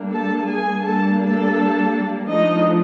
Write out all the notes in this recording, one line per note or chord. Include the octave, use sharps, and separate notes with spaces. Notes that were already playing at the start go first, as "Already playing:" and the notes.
Already playing: G3 A#3 D4
A4 A5
G#4 G#5
G3 A#3 D4 A4 A5
A4 A5
F3 A3 D4 D#4 D#5